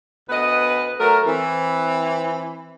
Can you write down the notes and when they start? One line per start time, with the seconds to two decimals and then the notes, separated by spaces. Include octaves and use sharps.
0.29 D2 B3 B4 D#5
0.99 F#3 A3 A#4
1.25 E3 C4